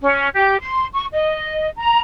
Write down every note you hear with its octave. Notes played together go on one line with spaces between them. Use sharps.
C#4
G4
C6
C#6
D#5
A#5